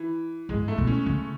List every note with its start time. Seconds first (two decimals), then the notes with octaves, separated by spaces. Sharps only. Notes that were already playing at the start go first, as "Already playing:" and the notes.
Already playing: E3
0.49 G#2 G#3
0.68 A3
0.78 B2
0.87 C#4
1.06 C#3